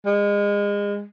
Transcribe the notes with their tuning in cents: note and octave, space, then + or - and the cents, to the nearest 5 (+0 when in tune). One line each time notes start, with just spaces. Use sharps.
G#3 -30